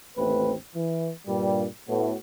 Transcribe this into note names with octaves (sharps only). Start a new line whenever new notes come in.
A1 D#2 A3 B3 C4 B4
E3
G2 A#2 G3
A2 B3 F#4